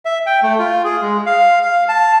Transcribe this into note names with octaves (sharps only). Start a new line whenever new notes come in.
E5
G5
A3
F4
G#4
G#3
F5
F5
A5